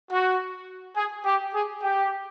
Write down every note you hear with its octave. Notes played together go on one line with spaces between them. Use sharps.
F#4
G#4
G4
G#4
G4